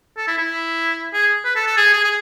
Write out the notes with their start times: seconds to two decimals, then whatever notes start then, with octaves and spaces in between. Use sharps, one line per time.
0.17 A4
0.28 E4
0.38 E4
1.13 G#4
1.45 B4
1.55 A4
1.66 A4
1.77 G#4
1.93 G#4
2.04 G#4